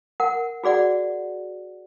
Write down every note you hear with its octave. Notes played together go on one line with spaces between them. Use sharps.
A#4 F#5
F#4 G#4 D5 F#5